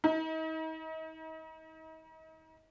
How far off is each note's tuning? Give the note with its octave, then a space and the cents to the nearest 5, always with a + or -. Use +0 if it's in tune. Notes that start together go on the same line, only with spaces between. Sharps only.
D#4 +40